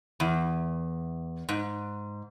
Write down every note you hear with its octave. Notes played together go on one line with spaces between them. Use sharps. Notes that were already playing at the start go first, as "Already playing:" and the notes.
E2
G#2